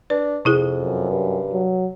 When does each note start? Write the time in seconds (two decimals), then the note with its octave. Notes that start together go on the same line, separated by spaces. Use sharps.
0.10 D4 B4
0.45 F2 C3 E4 G#4
0.80 F#2
1.10 G2
1.52 F#3